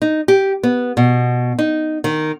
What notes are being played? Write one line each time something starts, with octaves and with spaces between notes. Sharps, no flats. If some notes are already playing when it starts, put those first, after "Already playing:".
D#4
G4
B3
B2
D#4
D#3